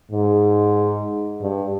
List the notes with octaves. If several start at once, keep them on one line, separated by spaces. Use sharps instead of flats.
G#2
G2